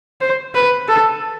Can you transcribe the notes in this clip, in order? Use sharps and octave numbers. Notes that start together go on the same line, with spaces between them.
C5
B4
A4